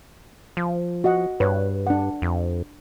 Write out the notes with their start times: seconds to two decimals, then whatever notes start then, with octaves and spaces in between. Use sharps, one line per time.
0.57 F3
1.04 F#4 D#5 F#5
1.40 G2 B4 C#5
1.87 D4 F#5
2.22 F2